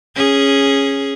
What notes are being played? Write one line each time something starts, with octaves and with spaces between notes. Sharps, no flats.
C#4 G#4